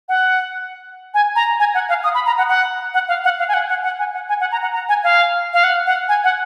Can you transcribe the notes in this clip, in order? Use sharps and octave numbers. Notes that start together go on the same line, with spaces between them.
F#5
G#5
A#5
G#5
F#5
F5
D#6
B5
A#5
F#5
F#5
F#5
F5
F#5
F5
G#5
F#5
F#5
F#5
G#5
F#5
G#5
F#5
A#5
F#5
A#5
G#5
F5
F5
F#5
F#5
G#5
F#5